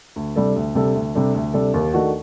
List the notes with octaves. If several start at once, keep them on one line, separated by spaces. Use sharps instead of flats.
D2
C3 G3 D4 A4
D2
C3 G3 D4 A4
D2
C3 G3 D4 A4
D2
C3 G3 D4 A4
D#2
D#3 A3 D4 F#4